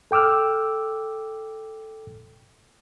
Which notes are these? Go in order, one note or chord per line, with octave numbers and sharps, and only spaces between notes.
A4 G5 D6 E6 F6